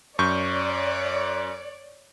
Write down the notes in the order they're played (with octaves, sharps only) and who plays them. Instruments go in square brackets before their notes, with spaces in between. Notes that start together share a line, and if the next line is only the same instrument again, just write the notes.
[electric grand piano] F#2 C#6 G6 [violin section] C#5 D5